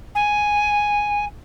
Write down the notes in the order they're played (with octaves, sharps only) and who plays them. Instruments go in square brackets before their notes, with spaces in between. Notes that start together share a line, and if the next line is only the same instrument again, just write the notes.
[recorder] G#5